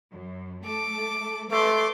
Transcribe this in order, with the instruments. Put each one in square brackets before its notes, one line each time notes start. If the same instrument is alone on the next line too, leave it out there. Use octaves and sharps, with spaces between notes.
[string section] F#2
[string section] A3 A4 [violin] D6
[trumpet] A3 [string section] A4 B4 C#5 [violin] C6 D6